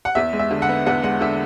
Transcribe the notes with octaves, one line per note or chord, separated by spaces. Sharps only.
F#5
E2 E5
G#3
E5
D3
F#5
B3
E2 F#5
G#3 F#5
D3 E5